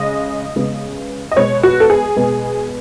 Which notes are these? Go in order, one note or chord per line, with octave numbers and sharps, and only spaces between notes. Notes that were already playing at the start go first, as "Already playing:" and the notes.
Already playing: C#3 G#3 D#5
C#3 G#3 B3
D#5
B2 G#3 B3 C#5
F#4
A4
G#4
B2 G#3 B3